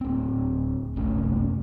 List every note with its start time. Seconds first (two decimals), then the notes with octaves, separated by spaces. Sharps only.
0.01 D1 C4
0.95 F#1 C2 A3 C#4